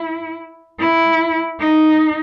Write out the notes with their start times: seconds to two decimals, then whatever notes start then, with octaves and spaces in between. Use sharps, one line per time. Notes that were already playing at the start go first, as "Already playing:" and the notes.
Already playing: E4
0.79 E4
1.60 D#4